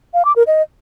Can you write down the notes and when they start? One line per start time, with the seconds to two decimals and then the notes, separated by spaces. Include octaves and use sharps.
0.14 F5
0.25 D6
0.36 A#4
0.47 D#5